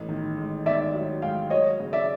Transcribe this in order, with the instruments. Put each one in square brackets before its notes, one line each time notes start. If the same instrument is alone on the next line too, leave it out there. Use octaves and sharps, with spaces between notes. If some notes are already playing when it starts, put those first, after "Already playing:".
Already playing: [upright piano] A1
D#3
G#2
[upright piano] D#3 [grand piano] D5 E5
[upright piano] F#3
[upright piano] G#2 [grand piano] F5 G5
[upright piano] F#3 [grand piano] C#5 D#5
[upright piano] C#3
[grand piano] D5 E5